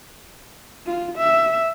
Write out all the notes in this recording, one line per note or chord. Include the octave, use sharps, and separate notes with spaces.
F4
E5